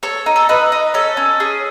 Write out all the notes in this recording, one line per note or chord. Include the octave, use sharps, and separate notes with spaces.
A4 C#5
D#4
A4
D#4 B4
D#4
C#4 A4
C#4
G#4